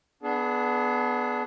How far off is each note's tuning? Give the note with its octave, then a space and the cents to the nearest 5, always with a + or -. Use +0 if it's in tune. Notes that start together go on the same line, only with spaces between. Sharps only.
B3 +0 D4 +0 G#4 +30